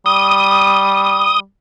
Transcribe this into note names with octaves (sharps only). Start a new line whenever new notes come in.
G3 D#6